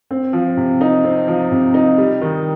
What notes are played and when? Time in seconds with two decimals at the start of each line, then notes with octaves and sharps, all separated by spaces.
0.11 C4
0.33 F3
0.57 C3
0.81 D#4
1.04 C4
1.28 F3
1.52 C3
1.74 D#4
1.98 G3
2.21 D#3